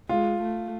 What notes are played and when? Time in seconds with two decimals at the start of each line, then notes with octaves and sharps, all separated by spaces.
0.09 G#3 F4
0.42 A3